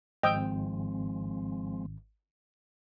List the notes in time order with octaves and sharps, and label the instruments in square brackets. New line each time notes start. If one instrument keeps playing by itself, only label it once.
[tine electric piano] G#1 [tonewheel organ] F3 G#3 C4 [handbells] D#5 D#6 E6 [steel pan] G5